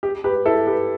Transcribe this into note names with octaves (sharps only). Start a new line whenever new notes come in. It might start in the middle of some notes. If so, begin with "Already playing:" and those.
G4
G4 B4
E4 A4
G4 B4